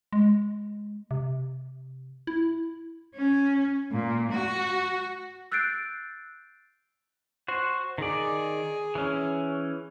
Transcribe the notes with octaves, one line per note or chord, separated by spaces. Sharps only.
G#3
C3
E4
C#4
A#2
F#4
E6 F#6 G6 A6 C7 D7
F#4 C5
D#3 G#4 D5
E3 C#4